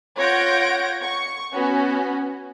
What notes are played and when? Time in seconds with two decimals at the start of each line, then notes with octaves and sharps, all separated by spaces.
0.18 F4 C#5 F#5 G6 A#6 D7
1.02 C#6
1.54 B3 C#4 F#4